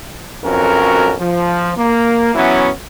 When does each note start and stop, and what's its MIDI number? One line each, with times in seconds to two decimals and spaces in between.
0.43 1.14 35
0.43 1.14 41
0.43 1.14 61
0.43 1.14 66
0.43 1.14 70
1.20 1.72 53
1.78 2.34 58
2.35 2.70 52
2.35 2.70 54
2.35 2.70 59
2.35 2.70 61
2.35 2.70 64